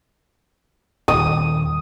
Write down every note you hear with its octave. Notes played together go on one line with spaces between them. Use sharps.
D#1 D#6